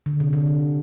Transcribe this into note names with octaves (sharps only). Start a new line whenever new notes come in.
D3
C3
D3